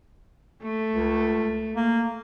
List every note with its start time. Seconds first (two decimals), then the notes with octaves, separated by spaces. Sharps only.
0.62 A3
0.92 C#2
1.76 A#3